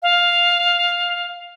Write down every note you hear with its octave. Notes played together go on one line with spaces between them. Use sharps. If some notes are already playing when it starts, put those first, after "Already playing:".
F5